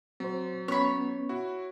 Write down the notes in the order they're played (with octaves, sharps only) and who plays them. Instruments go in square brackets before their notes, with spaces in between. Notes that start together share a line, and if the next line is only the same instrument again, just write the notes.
[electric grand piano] F#3 [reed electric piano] C4 C5
[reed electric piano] B3 C#4 [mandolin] C#5 B5
[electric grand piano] E4 F#4